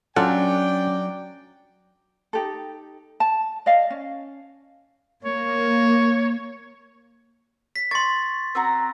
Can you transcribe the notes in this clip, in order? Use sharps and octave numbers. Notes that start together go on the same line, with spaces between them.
F#3 C#4 D4 F4 A4 D5 F#5 G5
D#4 G4 A4
A5
D5 D#5 F5
C#4
A#3 C#5
B6
C6 C#6 A6
C4 F#4 A#5